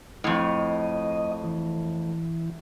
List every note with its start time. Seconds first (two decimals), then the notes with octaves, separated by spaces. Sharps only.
0.24 F2 A2 D#5
1.44 E3